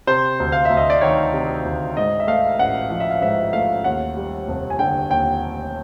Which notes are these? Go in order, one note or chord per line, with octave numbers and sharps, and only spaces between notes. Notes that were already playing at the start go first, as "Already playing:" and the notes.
C3 C5
D2
F5
D2 E5
D#5
D5
D#3 C#5
C3
D2
G#2 D#5
E5
A3 F5
A1 F#5
F3 F5
E5
F5
G#2 E5
A3 F5
D#2 F#5
G3
F1
G#5
D3 G5
D#2 G5